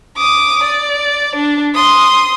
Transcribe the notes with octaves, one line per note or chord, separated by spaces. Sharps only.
D6 D#6
D5
D4
C6 D#6